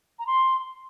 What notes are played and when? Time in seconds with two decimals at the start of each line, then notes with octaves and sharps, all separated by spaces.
0.19 A#5
0.27 C6